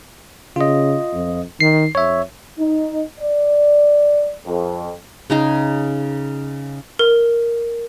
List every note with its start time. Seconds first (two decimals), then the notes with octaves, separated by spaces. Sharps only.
0.56 C#3 F4 D#5
1.13 F2
1.60 D#3 C7
1.95 F2 C#5 E5
2.59 D#4
3.20 D5
4.46 F2
5.30 C#3 D#4 G#4
6.99 A#4